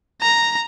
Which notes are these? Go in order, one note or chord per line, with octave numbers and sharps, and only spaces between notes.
A#5